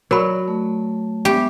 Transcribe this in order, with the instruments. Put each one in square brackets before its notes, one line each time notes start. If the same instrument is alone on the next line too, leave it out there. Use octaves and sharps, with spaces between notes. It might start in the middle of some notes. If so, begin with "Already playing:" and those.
[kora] F#3 [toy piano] A#4 B5 [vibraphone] C#5 D5
[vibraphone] A3
[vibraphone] G#3 B3 E5 [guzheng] G4